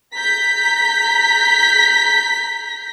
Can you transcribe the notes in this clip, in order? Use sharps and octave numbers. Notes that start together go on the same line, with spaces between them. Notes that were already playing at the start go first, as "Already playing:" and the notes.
A#5 G6 B6